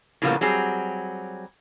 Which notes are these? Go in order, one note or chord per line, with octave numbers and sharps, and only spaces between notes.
A2 C#3 F3 G3 A#3 B3
F#3 G3 C4 G#4